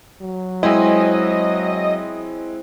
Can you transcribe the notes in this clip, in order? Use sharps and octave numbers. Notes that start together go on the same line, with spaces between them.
F#3
G#3 C4 E4 D#5 G#5